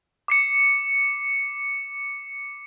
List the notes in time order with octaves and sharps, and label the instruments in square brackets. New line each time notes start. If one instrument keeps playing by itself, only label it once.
[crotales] D6 C7 C#7